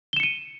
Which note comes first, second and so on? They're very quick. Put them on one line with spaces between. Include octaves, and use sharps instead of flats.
G7 E7 C#7 D#7